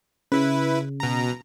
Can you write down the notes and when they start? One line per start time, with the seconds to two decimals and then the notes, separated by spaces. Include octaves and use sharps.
0.32 C#3 E4 B4
1.00 B2 A#5